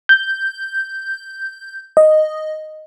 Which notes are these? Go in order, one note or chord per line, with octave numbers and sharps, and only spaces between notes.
G6
D#5